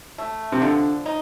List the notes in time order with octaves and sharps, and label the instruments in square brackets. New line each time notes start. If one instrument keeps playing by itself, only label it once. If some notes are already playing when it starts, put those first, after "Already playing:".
[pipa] A3
[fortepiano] C3
[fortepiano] D3 [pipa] F3
[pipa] D#4